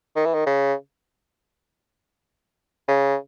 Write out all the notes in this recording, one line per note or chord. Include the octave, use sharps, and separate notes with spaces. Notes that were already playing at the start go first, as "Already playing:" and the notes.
D#3
E3
D#3
C#3
C#3